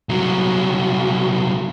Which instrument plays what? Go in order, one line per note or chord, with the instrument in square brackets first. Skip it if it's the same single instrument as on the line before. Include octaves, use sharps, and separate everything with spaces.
[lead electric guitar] C2 F#3